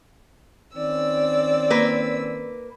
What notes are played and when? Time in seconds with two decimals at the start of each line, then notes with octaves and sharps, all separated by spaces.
0.75 D#3 C4 C#4 D5 E6
1.70 A#3 B4